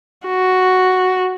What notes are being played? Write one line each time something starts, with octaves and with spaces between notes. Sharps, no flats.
F#4